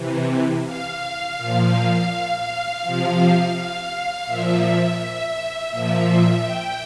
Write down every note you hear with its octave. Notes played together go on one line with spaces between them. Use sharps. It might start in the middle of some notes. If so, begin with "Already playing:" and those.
Already playing: C3 E3
F5
A#2 F3
C3 F3
F5
A#2 F3 E5
E5
A#2 F3
G5